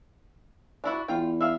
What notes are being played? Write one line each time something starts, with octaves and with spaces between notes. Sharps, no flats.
D4 E4 F#4
E2 F4 G5
E5 F5